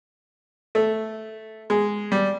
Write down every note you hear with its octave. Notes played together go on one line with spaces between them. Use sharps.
A3
G#3
G3